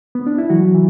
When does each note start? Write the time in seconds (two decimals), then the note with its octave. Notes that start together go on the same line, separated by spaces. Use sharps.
0.15 B3
0.27 D4
0.38 E4
0.50 E3 F#3 F#4
0.75 E3